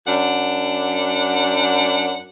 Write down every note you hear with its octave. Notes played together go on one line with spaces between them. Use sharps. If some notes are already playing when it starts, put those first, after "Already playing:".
F#2 D4 F#5